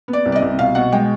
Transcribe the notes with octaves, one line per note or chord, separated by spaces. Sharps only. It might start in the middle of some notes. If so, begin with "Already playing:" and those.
B3
D5
C2
D5
D#5
C2
B2 F5
B2 F#5
G#3 G5